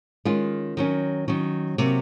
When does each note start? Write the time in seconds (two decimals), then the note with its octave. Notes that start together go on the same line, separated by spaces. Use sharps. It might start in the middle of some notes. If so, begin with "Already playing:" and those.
0.25 D#3 G#3 C#4 F4
0.77 D#3 F#3 C#4
1.28 D#3 F#3 C#4
1.78 C3 F#3 A#3